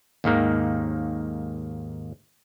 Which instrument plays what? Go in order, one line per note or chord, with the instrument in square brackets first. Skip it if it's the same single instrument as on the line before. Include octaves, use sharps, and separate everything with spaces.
[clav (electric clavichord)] D#2 G#2 D#3 A#3